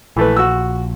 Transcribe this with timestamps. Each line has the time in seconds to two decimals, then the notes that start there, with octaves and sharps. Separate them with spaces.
0.17 A#1 E3 A3 B4
0.37 F#4 E6